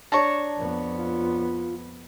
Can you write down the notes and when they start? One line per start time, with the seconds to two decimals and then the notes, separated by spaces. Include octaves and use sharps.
0.12 D4 C#5 A5 A#5 C#6
0.57 F2 B3
0.98 F4